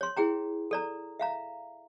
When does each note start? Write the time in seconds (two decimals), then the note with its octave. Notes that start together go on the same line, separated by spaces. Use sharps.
0.01 C#5 C6
0.17 E4 G#4 G5 A#5
0.71 A4 D5 A#5
1.19 E5 F5 A#5